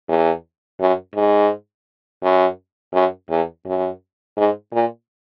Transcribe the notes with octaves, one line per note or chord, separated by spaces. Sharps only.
E2
F#2
G#2
F#2
F#2
E2
F#2
G#2
A#2